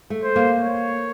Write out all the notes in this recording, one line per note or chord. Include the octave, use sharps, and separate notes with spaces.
A3
C5
A#3
C#5